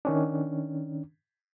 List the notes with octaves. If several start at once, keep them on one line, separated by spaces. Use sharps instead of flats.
D#3 C#4 D4